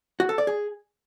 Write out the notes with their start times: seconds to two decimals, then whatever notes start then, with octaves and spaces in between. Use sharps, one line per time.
0.20 F#4
0.29 A4
0.38 D5
0.47 G#4